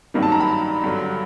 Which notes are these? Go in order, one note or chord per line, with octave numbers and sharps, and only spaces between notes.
G2 D#3 F#3 A#3
A5
A#5
B5
G2 D3 F#3